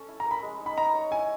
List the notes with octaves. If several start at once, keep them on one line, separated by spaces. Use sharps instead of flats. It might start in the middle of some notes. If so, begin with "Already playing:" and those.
Already playing: C#4 A4
E4
A#5
A#4
B5
G#3
D#4
B5
D#4 A#5
C#5
E4 G#5